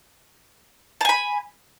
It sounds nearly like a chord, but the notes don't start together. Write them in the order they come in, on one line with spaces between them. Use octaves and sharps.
A5 G#5 B5